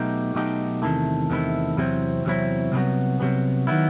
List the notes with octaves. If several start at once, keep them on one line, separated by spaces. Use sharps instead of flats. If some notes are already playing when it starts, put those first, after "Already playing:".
Already playing: B1 B2 A3 D#4 G4
B1 B2 A3 D#4 G4
E2 C3 D#3 A3 E4
E2 C3 D#3 A3 E4
E2 C3 F#3 C4 E4
E2 C3 F#3 C4 E4
C2 C3 F#3 B3
C2 C3 F#3 B3
D#3 F#3 B3 E4